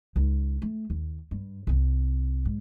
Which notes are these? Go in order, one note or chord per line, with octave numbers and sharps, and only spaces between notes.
C#2 D#4
A3
D#2
G2
C2 C4
G#2